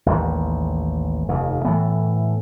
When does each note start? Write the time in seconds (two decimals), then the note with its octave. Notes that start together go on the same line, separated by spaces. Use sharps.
0.06 A1 D#2 G3
1.28 F1 D#2
1.65 A2 E3 B3